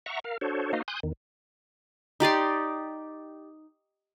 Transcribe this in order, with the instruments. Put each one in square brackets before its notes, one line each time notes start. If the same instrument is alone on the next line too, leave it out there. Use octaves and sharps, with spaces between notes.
[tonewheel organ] E5 F#5 A#5 C#6
A#4 F5
D4 F#4 A4 C5 C#5
A#3 D#4 F#4 C5 D#5 F5
G#5 C6 D#6 F#6 G6
E2 D#3
[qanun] D#4 G4 D5 C6